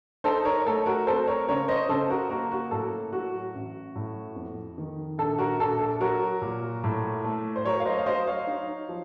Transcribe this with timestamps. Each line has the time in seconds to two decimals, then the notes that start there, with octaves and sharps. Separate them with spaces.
0.24 D#4 A4 C5
0.45 A#4 C#5
0.65 A3 A4
0.86 F#4 A#4
1.07 C4 A4 C5
1.28 A#4 C#5
1.48 C#3 A#4 C#5
1.68 C5 D#5
1.89 C#3 A4 C5
2.10 F#4 A#4
2.30 A#3 F#4 A#4
2.51 F#4
2.71 A2 A4
3.13 F#3 F#4
3.54 A1
3.95 A2
4.36 F2
4.78 D#3
5.18 A#1 A4
5.38 F#4 A#4
5.59 A#1 A4
5.81 A4
6.00 F#3 F#4 A#4
6.42 A#2
6.84 A2
7.24 A3
7.56 C5
7.65 F#3 A#4 C#5
7.80 F5
7.85 C5 D#5
7.98 F5
8.06 F#3 C5 D#5
8.27 C#5 F5
8.47 D#4
8.89 F3